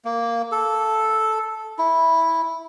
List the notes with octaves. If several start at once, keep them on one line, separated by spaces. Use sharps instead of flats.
A#3
A4
E4